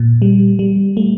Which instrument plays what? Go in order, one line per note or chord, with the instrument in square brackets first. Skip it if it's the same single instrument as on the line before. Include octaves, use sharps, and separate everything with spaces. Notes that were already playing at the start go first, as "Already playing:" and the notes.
Already playing: [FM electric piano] A#2
G3
G3
A3